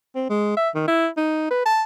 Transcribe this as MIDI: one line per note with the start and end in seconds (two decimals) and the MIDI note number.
0.15 0.25 60
0.30 0.55 56
0.57 0.69 76
0.75 0.83 51
0.88 1.08 64
1.17 1.48 63
1.51 1.63 71
1.66 1.83 81